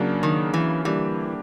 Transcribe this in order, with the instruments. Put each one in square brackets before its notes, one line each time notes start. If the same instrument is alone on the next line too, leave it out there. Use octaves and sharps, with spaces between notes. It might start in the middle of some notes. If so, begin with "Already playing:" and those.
Already playing: [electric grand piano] C#3 F#3 A#3 D4
[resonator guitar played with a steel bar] D#3
E3
[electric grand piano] D3 G3 A#3 D4 G4 [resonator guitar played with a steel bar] E3